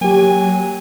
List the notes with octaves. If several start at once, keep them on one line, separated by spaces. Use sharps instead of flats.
F#3 A#3 G4 G#5